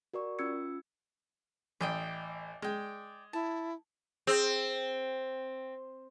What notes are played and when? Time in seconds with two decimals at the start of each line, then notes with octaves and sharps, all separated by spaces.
0.14 F#4 A#4 D5 C#6
0.39 C#4 F4 E6 G#6 C#7
1.81 A1 D5 D#5 G5
2.62 G#3 D5 G5
3.33 E4 A5
4.27 C4 G#4 E6 G6